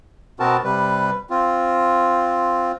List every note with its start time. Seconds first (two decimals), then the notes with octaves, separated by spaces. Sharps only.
0.40 B2 B3 C4 F#4 A#4 A5
0.64 C3 G3 B4
1.30 C4 F4